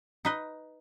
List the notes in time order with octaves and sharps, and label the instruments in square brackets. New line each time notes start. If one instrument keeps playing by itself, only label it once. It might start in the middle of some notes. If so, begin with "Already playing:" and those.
[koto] D#4 B4 D#5